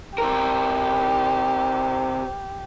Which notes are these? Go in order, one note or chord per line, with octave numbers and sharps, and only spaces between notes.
C3 G4 A#4